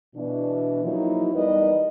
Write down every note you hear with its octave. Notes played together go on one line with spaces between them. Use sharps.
B2 E3 D4
F3 F#3 A#3 D#4 E4
E2 G3 D#4 A#4 B4 D#5